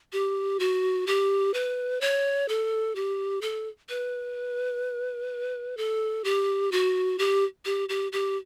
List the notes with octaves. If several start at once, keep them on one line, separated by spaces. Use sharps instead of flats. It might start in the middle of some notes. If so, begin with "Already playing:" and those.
G4
F#4
G4
B4
C#5
A4
G4
A4
B4
A4
G4
F#4
G4
G4
G4
G4